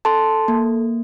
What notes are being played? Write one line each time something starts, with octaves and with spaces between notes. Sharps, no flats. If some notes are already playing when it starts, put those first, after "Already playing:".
A4 A5 C6
A#3